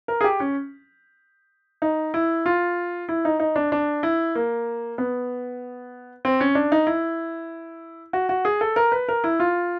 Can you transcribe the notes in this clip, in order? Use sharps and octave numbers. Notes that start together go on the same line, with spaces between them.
A#4
G#4
G4
C#4
D#4
E4
F4
E4
D#4
D#4
D4
D4
E4
A#3
B3
C4
C#4
D4
D#4
E4
F#4
F#4
G#4
A4
A#4
B4
A#4
E4
F4